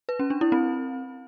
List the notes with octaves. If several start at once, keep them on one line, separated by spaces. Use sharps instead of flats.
B4
C#4
D4
E4
C4